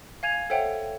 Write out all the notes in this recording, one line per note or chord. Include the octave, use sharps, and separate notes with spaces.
F5 G#5 G#6 D#7 F7
A4 C5 C#5 E5 F#5 G5